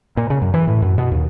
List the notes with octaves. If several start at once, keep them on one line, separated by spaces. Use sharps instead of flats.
A#2
C#3
F#2
E3
A2
F#2
B2
D#2